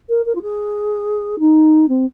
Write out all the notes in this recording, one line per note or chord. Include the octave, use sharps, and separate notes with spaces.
A#4
A#4
F4
G#4
D#4
C4